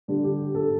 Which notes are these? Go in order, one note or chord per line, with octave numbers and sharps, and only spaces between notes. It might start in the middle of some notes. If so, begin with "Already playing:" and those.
D3 G3 D4
G4
G2 A4